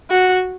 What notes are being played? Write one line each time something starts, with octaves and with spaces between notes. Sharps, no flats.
F#4